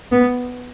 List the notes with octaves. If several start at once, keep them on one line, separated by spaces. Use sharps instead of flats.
B3